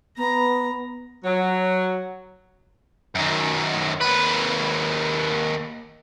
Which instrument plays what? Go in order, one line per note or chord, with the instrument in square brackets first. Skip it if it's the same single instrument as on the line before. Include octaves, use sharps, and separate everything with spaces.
[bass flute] B3 [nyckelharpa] A#5
[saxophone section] F#3
[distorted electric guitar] F#2 D#3
D#2 B4